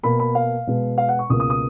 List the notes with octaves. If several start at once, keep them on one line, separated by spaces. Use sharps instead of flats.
B2 A#3 B5
B5
F5
B2 G#3 B3
F5
F#5
C#6
C#2 B2 A#3 D#6
D#6
D#6